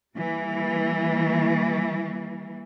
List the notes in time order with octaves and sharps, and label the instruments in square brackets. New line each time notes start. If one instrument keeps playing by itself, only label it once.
[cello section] E3 G3 A#3